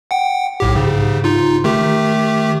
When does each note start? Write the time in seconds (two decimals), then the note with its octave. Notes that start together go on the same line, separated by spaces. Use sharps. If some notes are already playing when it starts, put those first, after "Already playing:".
0.11 F#5 G5
0.60 B1 A2 G4
0.75 G#2 C#3
1.24 D#4 F4
1.64 D#3 A3 G4